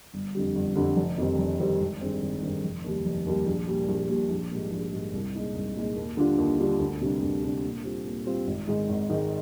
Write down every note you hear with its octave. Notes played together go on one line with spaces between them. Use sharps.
G1
F2 D3 G3
G1
F2 D3 G3
F1
F2 D#3 G3 C4
F1
F2 D#3 G3 C4
G#1
G2 D#3 G#3 C4
G#1
G2 D#3 G#3 C4
F1
D#2 D#3 G3
F1
D#2 D#3 G3
A#1
A#2 G3
A#1
A#2 G3
A#1
G#2 G3 A#3
A#1
G#2 G3 A#3
C2
A#2 G#3 D#4
C2
A#2 G#3 D#4
D#2
D3 G3 D4 F4
D#2
D3 G3 D4 F4
D2
C3 G3 D4
D2
C3 G3 D4
A#2
G3 C4 F4
A#2
G3 C4 F4
G#1
G#2 D#3 G#3 D#4
G#1
G#2 D#3 G#3 D#4